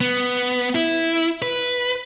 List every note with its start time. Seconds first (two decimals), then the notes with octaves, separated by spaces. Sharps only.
0.01 B3
0.75 E4
1.42 B4